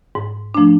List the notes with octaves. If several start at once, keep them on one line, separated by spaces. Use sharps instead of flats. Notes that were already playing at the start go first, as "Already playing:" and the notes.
G#2
F3 A3 D4